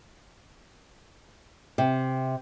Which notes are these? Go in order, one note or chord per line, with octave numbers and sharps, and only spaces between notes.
C3